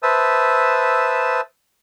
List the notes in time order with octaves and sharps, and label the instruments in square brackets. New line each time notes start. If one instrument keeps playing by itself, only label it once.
[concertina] B4 C5 E5 A5 D#6 E6